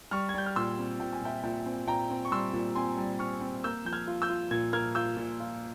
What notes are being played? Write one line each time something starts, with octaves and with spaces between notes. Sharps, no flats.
G3 C#6 F6
G#6
G3 G6
F6
A#2 C6 E6
C4
A#2 G5
G#5
A#2 E5 G5
A#2 E5 G5
C4
A#2 G5 A#5
C4
C#6
G3 C6 E6
A#2
C4 G#5 C6
G3
C4 C#6 F6
C4
A#3 E6 G6
F3 G6
F6 G#6
F4
E6 G6
F4
A#2 G#6
A#3 F6 G#6
F4 E6 G6
A#2
F4